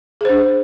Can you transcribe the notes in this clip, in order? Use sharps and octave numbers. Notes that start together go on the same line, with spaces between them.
D4 G#4 C5